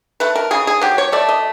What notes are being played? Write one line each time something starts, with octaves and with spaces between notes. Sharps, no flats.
A3 B4
A#4
C#3 G#4
G#4
F#3 G4
C#5
A3 D5
D#5